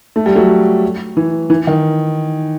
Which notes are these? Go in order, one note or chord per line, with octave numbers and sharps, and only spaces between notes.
A3
G3
F#3 A3
E3
E3
D#3